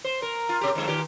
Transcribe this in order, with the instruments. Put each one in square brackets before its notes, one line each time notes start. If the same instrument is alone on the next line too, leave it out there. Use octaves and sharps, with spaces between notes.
[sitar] C5
A#4
F4
C3 G4
F2 D#3 G#3
A#2 D#3 G4